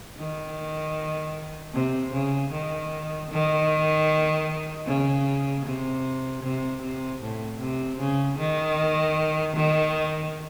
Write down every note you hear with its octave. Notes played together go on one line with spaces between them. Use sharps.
D#3
C3
C#3
D#3
D#3
C#3
C3
C3
C3
A2
C3
C#3
D#3
D#3